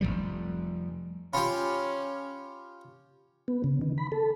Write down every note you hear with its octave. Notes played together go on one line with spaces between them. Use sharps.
F1 F2 F3 G3
C#4 F4 G4 B5
B3
C#3
D#3
B5
A4